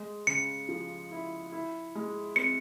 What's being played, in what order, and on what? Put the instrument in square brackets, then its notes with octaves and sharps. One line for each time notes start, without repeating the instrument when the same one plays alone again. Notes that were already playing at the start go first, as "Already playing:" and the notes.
Already playing: [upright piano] G#3
[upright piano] C#3 [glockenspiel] C#7
[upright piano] F3
E4
E4
G#3
[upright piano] C4 [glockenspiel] C#7